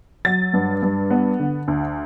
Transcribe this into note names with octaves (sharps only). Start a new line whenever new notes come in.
F#3 A6
G2
G2
B3
D3
D2